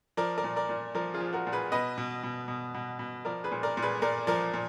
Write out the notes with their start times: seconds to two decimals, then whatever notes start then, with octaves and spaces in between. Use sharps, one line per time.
0.17 F3 A#4 D5
0.38 A#4 D5
0.44 A#2
0.56 A#4 D5
0.69 A#2
0.95 F3 A#4 D5
1.14 F4 G#4
1.20 F3
1.33 F#4 A#4
1.47 A#2
1.52 G#4 B4
1.72 B2 B4 D#5
1.98 B2
2.23 B2
2.48 B2
2.74 B2
2.99 B2
3.25 F3 A#4 D5
3.44 G#4 B4
3.51 A#2
3.63 A#4 D5
3.77 A#2
3.82 G#4 B4
4.02 A#2 A#4 D5
4.27 F3 A#4 D5
4.53 A#2